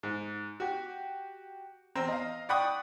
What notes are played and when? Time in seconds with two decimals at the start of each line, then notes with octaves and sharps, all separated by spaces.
0.03 G#2
0.60 F#4 G4
1.95 E2 C4 A#5
2.08 D#5 F5
2.49 D5 F#5 G5 B5 C#6 D#6